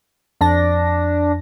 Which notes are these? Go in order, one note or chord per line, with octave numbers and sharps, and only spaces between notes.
F2 D4 A#6